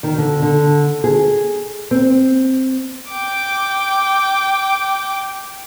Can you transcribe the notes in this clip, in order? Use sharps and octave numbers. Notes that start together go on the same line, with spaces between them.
D#3
D3
D3
G#4
C4
G5 D6